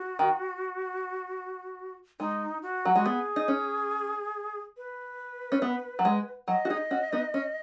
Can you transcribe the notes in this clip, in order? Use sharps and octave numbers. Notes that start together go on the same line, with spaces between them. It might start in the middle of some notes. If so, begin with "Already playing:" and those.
Already playing: F#4
D#3
G#3 D#4
F#4
F#3
G#3 F#4
B3 G#4
D#4
C#4
B4
C#4
B3
F#3
G#3
F#3 D#5
F#4
D#4 G#4
C#4 F#4
B3 D#4
C#4